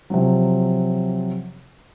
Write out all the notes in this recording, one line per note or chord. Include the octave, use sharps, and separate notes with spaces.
C3 F3 F#3